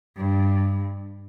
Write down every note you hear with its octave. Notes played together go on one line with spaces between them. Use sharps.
G2